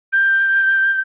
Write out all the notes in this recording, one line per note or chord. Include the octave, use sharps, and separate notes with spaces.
G6